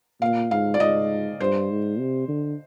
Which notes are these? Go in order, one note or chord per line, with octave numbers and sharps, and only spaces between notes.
A#2 F5
G#2 F5
D5
G#2 D#5
G2 C5
G#2
C3
D3